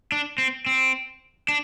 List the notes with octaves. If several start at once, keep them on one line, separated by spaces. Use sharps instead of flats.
D4
C4
C4
D4